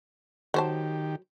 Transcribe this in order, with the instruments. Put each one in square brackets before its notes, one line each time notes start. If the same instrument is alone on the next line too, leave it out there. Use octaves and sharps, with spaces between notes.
[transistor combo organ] D#3 G4 [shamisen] F#3 C5 A5